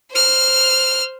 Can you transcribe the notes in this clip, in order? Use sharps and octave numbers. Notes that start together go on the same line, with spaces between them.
C5 F6